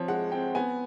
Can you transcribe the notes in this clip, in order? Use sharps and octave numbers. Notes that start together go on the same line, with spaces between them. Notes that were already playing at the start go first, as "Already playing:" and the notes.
Already playing: F3 C4 C#5
G#3 F#5
C4 G5
B3 G#5